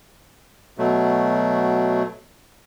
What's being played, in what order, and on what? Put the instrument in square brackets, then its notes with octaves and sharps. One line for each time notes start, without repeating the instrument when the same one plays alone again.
[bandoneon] B2 F#3 A3